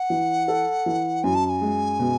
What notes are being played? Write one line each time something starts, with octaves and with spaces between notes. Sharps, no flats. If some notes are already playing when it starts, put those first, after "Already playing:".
Already playing: F#5
E3
A4
E3
F#2 G#5
A5
A5
G#5
G#3
B2